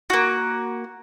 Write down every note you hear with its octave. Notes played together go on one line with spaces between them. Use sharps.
A#3 F#4